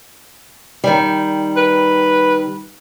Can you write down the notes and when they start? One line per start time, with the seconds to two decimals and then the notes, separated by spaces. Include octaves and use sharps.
0.84 D#3 G3
1.57 B4